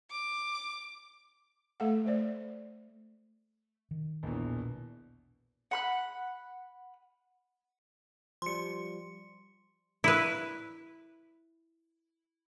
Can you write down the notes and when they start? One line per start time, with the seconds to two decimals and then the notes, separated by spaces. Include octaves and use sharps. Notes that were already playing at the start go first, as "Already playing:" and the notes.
0.11 D6
1.80 A3 A4 F5 F#5
2.05 A3 C5 D5
3.91 D#3
4.23 A#1 E2 B2
5.71 F#5 B5 F#6
8.42 F3 G3 C6 C#7
10.04 E4 B4